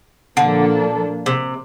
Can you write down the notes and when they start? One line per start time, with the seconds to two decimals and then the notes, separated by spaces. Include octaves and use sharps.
0.37 A#2 D3 F3 A#3 D4 A4
1.26 C3